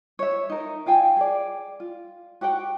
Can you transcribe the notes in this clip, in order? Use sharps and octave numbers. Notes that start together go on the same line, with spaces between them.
C#5 E5
D#4 A#4
F4 F5 G5 G#5
G#4 D5
F4
F#4 G4 F#5 G5